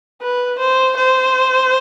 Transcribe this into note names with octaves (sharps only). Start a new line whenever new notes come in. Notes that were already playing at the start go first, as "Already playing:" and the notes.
B4
C5
C5